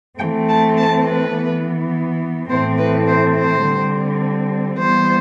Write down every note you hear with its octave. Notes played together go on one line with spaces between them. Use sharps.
E3 A3 C4 G5
A5
A5
B4
E3 B3
A2 E3 A3 C4 C5
B4
C5
C5
D3 G3 C4
E3 G3 B3 C5